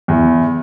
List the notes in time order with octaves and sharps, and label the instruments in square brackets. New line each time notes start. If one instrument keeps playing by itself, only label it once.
[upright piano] E2